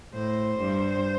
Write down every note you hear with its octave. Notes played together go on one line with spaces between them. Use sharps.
A2 C5
G2